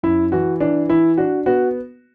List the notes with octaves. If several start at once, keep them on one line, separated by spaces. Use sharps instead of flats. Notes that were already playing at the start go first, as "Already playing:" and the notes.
F#2 E4
E3 F#4
E3 D4
E3 E4
D4 F#4
B3 F#4